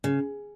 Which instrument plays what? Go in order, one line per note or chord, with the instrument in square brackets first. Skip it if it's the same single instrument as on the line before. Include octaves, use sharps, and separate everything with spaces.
[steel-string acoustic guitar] C#3